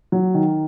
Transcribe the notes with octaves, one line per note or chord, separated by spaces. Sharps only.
F#3
D#3